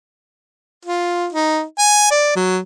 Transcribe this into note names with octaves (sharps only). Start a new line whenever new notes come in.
F4
D#4
G#5
D5
F#3